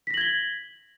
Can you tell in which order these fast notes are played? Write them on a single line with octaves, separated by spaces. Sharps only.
B6 A#6 F#7 G#6 G7